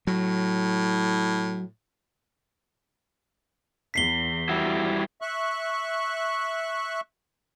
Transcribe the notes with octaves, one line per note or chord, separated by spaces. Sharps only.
A2 F#3
E2 B6 C7 G7
G3 E4 F#4
E5 C#6 F#6